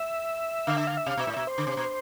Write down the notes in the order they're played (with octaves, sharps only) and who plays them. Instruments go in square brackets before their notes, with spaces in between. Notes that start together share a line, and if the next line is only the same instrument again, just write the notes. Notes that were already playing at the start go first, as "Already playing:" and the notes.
Already playing: [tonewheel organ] E5
[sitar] D3 [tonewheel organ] F5
[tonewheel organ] E5
F5
E5
[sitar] C3 [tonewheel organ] F5
[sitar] B2
[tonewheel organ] E5
[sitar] A2
[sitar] B2 [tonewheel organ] E5
[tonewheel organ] C5
[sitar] D3
C3
B2